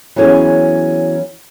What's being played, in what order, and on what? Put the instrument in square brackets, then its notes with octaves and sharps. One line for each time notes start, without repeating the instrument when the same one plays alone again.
[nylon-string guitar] E3 F#3 B3 C#4 G#4 C#5